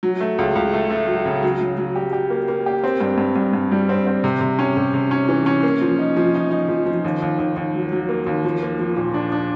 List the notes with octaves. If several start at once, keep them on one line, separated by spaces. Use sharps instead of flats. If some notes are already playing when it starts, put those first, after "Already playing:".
F#3
A3
C#2
C#2
A3
A3
F#3
C#3
F#3
F#3
F#3
G4
G4
A#3
A#3
G4
C4
G2
G2
G2
G2
G3
C4
C4
C3
C3
C#4
C3
C3
C#4
E3
C#4
A#3
F3
D#4
F3
D#4
D#4
F3
F3
D#2
D#2
D#2
D#2
F#3
F#3
A#3
D#2
F3
A#3
F3
A#2
D4
D4